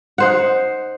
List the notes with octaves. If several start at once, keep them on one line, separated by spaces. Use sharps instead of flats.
D#4 C5 F#5